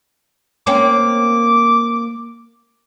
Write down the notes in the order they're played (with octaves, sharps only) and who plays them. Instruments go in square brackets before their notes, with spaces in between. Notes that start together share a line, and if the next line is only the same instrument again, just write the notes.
[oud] A#3 C4 C#4 [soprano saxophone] D6